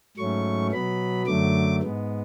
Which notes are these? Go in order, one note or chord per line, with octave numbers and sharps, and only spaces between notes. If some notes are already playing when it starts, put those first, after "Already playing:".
G#2 F#3 A3 C#4 C#6
B2 F#3 B3 B5
F#2 D3 F#3 A3 D6
G#2 G#3 B3